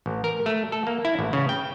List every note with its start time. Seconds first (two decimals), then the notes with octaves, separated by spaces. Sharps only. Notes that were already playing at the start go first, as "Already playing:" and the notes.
0.06 A1
0.24 A#4
0.46 A3
0.72 A4
0.87 A#3
1.05 E4
1.19 A1
1.33 C#3
1.49 G5